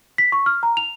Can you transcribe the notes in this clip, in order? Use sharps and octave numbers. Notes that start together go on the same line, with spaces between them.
B6
C#6
F6
A#5
F7